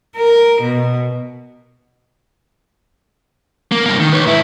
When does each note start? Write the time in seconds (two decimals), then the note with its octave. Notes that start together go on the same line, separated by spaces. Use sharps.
0.17 A#4
0.61 B2
3.72 A#3
3.86 G2 A#3
4.00 D#3
4.13 B4 C#5
4.26 G#2 E4